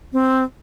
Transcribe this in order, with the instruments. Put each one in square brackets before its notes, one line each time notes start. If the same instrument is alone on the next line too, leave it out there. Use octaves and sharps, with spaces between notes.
[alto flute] C4